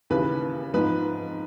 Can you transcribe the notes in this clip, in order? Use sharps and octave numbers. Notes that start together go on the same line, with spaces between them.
D#2 C#3 E3 B4
G#2 F3 B4